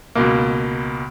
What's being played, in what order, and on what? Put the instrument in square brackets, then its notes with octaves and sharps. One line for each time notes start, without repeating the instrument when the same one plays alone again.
[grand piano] C#2 B2 A#3